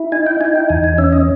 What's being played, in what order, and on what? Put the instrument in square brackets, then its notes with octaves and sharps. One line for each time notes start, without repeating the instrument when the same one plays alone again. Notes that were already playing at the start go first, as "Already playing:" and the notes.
Already playing: [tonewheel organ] E4
D#4 G#5
G5
D#4 G#5
G5
E2 G#5
G#5
C#4 E5
D#5